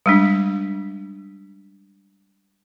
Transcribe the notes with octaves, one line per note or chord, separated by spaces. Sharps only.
G3 G#3 D4